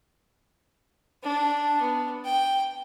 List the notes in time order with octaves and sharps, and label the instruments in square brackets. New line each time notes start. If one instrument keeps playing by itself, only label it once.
[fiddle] D4
B3
G5